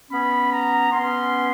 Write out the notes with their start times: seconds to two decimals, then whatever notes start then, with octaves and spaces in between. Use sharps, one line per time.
0.11 B3 C#4 B5
0.51 A#5
0.91 B3 C#4 C6